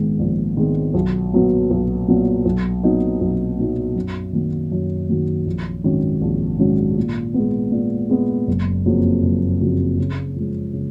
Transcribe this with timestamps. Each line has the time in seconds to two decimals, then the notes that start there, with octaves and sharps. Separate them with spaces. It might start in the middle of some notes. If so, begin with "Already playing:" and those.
Already playing: A#1 G#2 D#3 G#3 B3
0.19 A#1
0.57 G#2 D#3 G#3 B3
0.94 B1
1.33 A#2 F#3 B3
1.70 B1
2.08 A#2 F#3 B3
2.45 B1
2.83 A#2 F#3 B3 D#4
3.21 B1
3.58 A#2 F#3 B3 D#4
3.96 F#2
4.33 D#3 F#3 A#3
4.72 F#2
5.09 D#3 F#3 A#3
5.46 A#1
5.84 G#2 D#3 F#3 C#4
6.22 A#1
6.59 G#2 D#3 F#3 C#4
6.96 A#2
7.34 G#3 B3
7.72 A#2
8.09 G#3 B3
8.48 F#1
8.85 F2 C#3 F#3 A#3
9.23 F#1
9.61 F2 C#3 F#3 A#3
9.98 C#3
10.36 F3 G#3
10.73 C#3